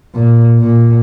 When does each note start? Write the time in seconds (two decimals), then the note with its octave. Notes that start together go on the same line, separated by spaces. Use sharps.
0.14 A#2
0.60 A#2